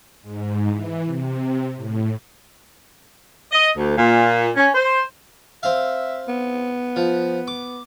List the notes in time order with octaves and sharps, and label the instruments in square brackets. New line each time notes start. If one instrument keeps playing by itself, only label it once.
[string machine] G#2
E3
C3
A2
[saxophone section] D#5
D2
A#2
C#4
C5
[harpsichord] C4 F5 [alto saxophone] E5
[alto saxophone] B3
[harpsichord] F3
D6